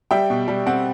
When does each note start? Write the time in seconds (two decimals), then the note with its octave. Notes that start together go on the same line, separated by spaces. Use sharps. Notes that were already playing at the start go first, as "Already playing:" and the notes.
0.11 G3 E5 G5
0.30 B2
0.48 G3
0.67 C4 F#5